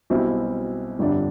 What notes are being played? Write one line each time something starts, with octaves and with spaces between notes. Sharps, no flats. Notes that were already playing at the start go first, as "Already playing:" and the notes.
B1 B2 G3 C4 E4
G1 F2 D3 G3 D4